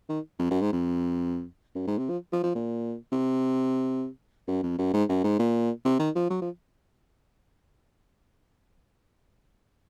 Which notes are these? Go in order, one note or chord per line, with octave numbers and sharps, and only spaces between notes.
D#3
F2
F#2
G#2
F2
F#2
G#2
C3
F3
F3
F3
A#2
C3
F#2
F2
F#2
G#2
F#2
G#2
A#2
C3
D#3
F3
F#3
F3